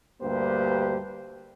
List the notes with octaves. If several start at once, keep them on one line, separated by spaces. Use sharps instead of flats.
D2 G2 A#3 G4 B4 C5